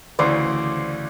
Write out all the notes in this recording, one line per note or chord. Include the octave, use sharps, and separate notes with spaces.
D2 C#3 E3 C5 D5